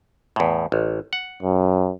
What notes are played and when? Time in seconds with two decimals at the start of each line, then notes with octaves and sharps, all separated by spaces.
0.36 E2 A2
0.72 A1
1.13 F#5
1.42 F#2